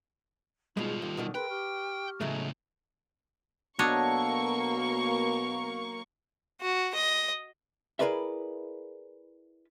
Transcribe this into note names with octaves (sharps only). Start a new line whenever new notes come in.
B2 G3 G#3 D#4 F4 G#4
D#2 A4
B2 D3 D#3
G#4 A#4 B4 G5 C6
G4 C#6 F6
A2 C#3 F#3 G#3 A3
B2 F#3 A#3 D4 A4 C#5 D#5 C#6
F#4
D#5
E4 G#4 A#4 B4 D5 E5